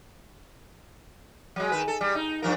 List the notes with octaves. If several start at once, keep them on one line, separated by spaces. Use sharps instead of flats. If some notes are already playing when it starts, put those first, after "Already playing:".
F#3 G#3
D#3 B4
A4
G3
D#4
G2 F3 A#4